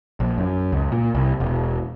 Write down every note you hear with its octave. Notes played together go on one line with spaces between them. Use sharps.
A#1
F#2
C#2
A#2
C2
E1